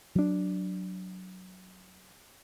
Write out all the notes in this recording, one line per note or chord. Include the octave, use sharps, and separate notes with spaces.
F#3 D4